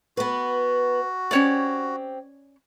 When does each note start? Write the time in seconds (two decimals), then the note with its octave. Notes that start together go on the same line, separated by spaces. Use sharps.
0.17 B3 F#4 B4
1.31 C4 C#4 G4 C#5 D5